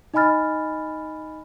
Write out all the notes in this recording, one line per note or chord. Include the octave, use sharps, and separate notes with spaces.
D#4 D#5 G#5 B5 F6 A6